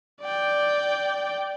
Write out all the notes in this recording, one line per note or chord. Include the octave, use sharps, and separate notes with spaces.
D5 G5